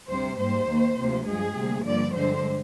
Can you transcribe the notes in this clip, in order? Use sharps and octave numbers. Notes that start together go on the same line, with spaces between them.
D2 C3 G3 C5
G#2 G3 A#3 C5
D#2 D#3 A#3
D2 C3 F3 A#3
G2 F3 G#3 G#4
D2 C3 G3 A#3
G2 D3 F3 A#3 D5
G2 D3 G#3 C5